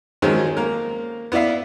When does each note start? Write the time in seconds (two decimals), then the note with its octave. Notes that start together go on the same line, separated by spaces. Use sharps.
0.22 D#3 F3 F#3 G#3 C4 C#4
0.57 A#3 A#4
1.32 B3 E4 D5 E5 F5